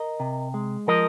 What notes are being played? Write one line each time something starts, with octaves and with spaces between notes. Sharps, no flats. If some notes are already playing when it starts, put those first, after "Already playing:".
Already playing: A#4 D#5
C3
G#3
F3 A#4 D#5